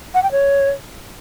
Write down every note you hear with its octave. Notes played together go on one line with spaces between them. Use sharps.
F#5
G5
C#5